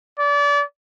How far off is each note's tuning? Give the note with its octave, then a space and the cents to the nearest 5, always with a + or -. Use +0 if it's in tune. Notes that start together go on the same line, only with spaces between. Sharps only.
D5 -30